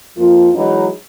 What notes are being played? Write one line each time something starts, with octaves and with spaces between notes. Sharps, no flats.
F2 F3 A#3 F4
E3 F#3 G#3 D#4